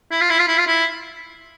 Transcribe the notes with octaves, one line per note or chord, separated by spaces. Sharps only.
E4
F4
E4
F4
E4
F4
E4